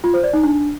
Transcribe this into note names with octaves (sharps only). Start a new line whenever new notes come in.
F4
C5
D5
D#4
D4